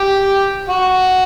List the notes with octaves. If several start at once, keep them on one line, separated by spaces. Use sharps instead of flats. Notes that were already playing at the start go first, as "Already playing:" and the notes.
Already playing: G4
F#4